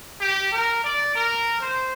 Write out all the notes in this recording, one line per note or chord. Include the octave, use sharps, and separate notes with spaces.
G4
A#4
D5
A#4
C5